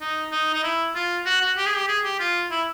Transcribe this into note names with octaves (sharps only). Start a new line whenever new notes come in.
D#4
D#4
D#4
E4
F4
F#4
F#4
G4
G#4
G4
G#4
G4
F4
E4